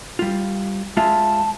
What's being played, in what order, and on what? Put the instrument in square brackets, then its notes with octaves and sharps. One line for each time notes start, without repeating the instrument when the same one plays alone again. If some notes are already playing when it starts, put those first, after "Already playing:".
[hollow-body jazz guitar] G3 F4
[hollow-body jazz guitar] G#3 F4 E5 [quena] A5